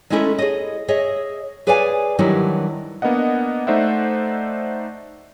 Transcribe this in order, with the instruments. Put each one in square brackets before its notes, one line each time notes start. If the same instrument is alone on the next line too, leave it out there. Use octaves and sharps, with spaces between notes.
[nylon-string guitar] G#3 A3 C#4 E4 A4 A#4
G#4 C#5 D#5
G#4 C#5 D#5 E5
G#4 B4 C#5 D5 F5 G#5
D#3 E3 F#3 G3 D4 E4
[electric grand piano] A#3 B3 D4 D#5 F#5
A3 D#4 C5 D5 E5 F#5